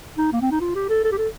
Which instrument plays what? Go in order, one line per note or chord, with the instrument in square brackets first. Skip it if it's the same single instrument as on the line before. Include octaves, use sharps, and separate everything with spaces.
[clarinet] D#4
A#3
C4
D#4
F4
G4
A4
A4
G4
A4